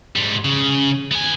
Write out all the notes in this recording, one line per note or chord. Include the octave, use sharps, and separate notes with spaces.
G#2 G3
C#3
B3 G#5